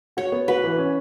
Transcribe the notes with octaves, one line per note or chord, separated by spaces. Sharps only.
F#4 C#5
B3
F#4 B4
E3
C#4